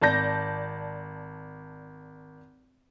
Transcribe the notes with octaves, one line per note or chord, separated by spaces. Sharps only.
G#1 D5 A5 G6 A#6